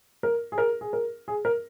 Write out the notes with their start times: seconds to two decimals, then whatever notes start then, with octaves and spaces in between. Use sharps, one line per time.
0.23 A#4
0.52 G#4
0.58 A#4
0.81 G#4
0.93 A#4
1.28 G#4
1.45 A#4